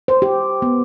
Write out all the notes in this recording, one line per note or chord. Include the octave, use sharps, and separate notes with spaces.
C5
G4
B3